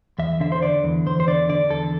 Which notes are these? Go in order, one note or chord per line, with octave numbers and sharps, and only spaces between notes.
E2 E5
D3 E5
C5
D3 D5
E2
E2 C5
C5
D3 D5
D3 D5
E2 A4